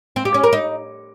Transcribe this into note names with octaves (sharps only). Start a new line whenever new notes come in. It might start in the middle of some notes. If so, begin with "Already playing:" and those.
C4
G4
C#4
A#4
D#4